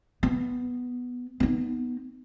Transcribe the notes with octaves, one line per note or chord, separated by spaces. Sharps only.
B3
B3 D#4